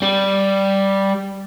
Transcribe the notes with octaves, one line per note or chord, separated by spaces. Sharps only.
G3